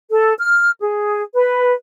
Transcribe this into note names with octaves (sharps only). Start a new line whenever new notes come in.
A4
F6
G#4
B4